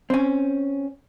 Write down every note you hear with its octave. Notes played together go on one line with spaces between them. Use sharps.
C4 C#4